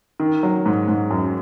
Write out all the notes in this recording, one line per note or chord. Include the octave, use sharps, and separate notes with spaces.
D#3
F#3
G#2
G#2
F#2